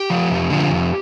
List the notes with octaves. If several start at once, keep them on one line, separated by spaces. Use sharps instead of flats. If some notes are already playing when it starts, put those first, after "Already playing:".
Already playing: G4
F3
F2
D3 F3
F2